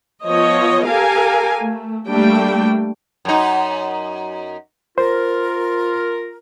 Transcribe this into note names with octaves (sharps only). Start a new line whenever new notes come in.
F3 B3 C#5 D#5
G4 A4 A#4 F5 G#5
A3
G3 A3 A#3 D4 G5
F#2 D#4
F4 A#4 C5